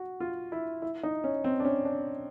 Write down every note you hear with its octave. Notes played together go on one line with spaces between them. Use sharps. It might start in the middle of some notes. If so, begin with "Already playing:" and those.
Already playing: F#4
F4
E4
E4
D#4
C#4
C4
D4
C#4
D4